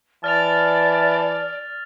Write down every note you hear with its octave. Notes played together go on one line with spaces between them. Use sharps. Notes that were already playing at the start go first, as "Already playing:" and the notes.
E3 D5 A5 F6 A6 F7